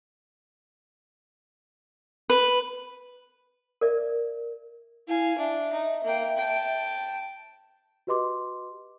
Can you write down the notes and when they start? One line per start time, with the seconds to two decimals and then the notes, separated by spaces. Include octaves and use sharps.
2.30 B4
3.81 A#4 D5 E5
5.08 E4 F5 G#5
5.38 D4 E5
5.73 D#4
6.04 A#3 G5
6.37 G5 A5
8.07 F#4 G4 B4 D#5 C6 D6